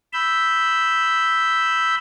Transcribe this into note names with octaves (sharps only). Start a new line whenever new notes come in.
B5 E6 G6